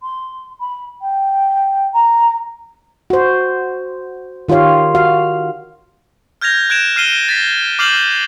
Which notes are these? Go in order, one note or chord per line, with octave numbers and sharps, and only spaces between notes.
C6
B5
G5
A#5
F#4 C5
D#3 F4 G4 C#5 F5
F#4 F5
F6 G6 G#6 A#6 F7
F#6 G#6 D7 E7 F7
F6 C7 D#7 G7
A6 B6
D6 F6 G6 C7 E7 F#7